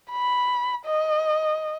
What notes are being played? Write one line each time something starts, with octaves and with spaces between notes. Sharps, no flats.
B5
D#5